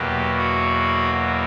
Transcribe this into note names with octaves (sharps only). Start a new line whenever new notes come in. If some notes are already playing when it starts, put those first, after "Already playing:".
Already playing: E2 B2 F#3 A#3 G4
F#4